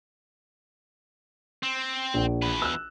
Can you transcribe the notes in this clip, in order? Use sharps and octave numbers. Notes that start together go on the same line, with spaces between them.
C4
A#1
E2 B4
E6 F#6